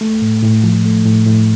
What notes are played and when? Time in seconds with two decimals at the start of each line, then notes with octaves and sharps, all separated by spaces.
0.01 A3
0.22 A2
0.43 A2
0.64 F3
0.85 A3
1.05 A2
1.26 A2